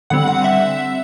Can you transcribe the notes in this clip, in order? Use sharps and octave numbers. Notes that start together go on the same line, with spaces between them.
D3 G3 C4 F#5
F#5
E5